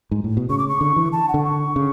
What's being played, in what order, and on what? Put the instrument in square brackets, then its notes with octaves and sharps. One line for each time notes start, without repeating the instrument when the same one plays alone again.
[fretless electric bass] G#2
A2
B2
[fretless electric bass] C#3 [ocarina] C#6
[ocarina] D6
C#6
[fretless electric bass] D3
E3
[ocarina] A5
F#5
[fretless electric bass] D3
[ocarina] C#6
[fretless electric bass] C#3